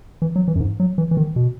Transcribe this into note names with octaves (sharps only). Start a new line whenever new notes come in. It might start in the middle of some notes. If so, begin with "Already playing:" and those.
E3
F#3
E3
F#2
G#2
F#3
E3
E3
D#3
B2